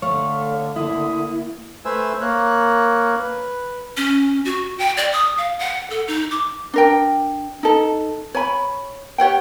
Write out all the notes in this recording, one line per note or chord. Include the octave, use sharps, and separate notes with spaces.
D3 A3 C#5 F5
A#3 E4 D#6
A3 B4 C5 E5 G#5 E6
A#3 A#4 C#5 F#6
B4
C#4
F#4
G5
D5
D#6
F5
F#5
A4
D#4
D6
D4 A#4 G5
D#4 A4
C#5 G#5 B5
G4 C#5 F#5 G5